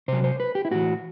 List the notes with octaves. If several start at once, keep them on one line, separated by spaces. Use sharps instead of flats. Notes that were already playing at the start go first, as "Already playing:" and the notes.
C3 F#3 C5
C5
B4
G4
E4
A2 E3 F#4